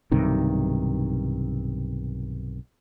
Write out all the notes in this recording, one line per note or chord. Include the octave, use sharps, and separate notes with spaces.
B1 G2 C3 D#3